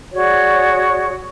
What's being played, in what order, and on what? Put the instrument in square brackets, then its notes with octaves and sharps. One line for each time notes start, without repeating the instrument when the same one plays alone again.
[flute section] F#4 G#4 C#5 D5